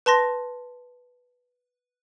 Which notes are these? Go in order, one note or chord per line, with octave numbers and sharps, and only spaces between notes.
B4 A5 C6 A#6